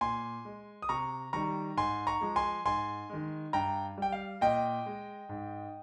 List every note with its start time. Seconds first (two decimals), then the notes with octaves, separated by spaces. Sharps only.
0.01 A#2 G#5 C6
0.45 G#3
0.82 D#6
0.89 C3 A#5 C#6
1.33 D#3 G3 A#5 C#6
1.77 G#2 G#5 C6
2.07 A#5 C#6
2.21 F3 G#3
2.36 G#5 C6
2.65 G#2 G#5 C6
3.10 D#3 G#3
3.53 G2 G5 A#5
3.98 G3 G5
4.12 F5
4.41 A#2 D#5 G5
4.86 G#3
5.29 G#2